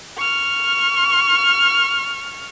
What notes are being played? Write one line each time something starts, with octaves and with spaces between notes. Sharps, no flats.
C#6 F6